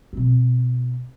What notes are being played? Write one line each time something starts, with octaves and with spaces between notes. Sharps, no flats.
B2 C4